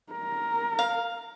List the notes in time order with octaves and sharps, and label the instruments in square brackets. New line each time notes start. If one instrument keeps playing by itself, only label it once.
[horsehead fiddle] A#4
[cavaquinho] F5